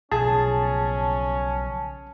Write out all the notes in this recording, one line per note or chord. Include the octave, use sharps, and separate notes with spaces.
B1 C#3 F3 C#4 G#4 A5